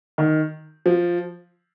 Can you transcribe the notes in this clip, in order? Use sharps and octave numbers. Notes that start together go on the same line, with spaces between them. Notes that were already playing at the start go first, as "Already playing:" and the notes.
D#3
F3